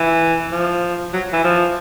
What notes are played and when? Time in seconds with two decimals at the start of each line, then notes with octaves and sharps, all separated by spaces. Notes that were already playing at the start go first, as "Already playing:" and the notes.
Already playing: E3
0.52 F3
1.13 F#3
1.33 E3
1.44 F3